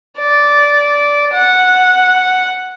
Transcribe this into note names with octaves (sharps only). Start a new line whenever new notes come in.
D5
F#5